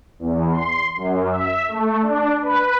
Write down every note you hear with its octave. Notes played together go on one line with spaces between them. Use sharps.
E2
C6
F#2
E5
A3
D4
B4